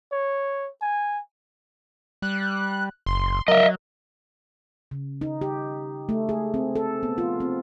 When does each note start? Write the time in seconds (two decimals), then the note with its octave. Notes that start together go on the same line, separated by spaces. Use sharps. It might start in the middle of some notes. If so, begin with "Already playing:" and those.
0.12 C#5
0.81 G#5
2.22 G3 F#6
3.06 F#1 C6
3.48 F#3 A#4 D#5 E5
4.91 C#3
5.21 D#4
5.41 G4
6.09 A3
6.29 G#4
6.54 C4
6.76 A4
7.03 B3
7.18 F4
7.40 C4